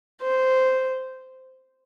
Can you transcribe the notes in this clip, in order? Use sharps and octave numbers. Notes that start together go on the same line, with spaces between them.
C5